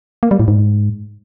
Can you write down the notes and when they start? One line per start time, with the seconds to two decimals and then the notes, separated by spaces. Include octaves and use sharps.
0.23 A#3
0.31 G3
0.40 A2
0.48 G#2